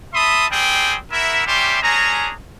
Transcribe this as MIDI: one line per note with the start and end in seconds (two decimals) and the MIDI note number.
0.14 0.47 76
0.14 0.47 81
0.14 0.47 83
0.14 0.47 84
0.14 0.47 87
0.50 0.96 55
0.50 0.96 60
0.50 0.96 68
0.50 0.96 79
1.12 1.43 64
1.12 1.43 66
1.12 1.43 70
1.12 1.43 76
1.47 1.81 55
1.47 1.81 61
1.47 1.81 67
1.47 1.81 76
1.47 1.81 84
1.82 2.33 61
1.82 2.33 62
1.82 2.33 68
1.82 2.33 82